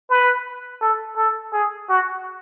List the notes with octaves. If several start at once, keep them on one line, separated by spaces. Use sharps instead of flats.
B4
A4
A4
G#4
F#4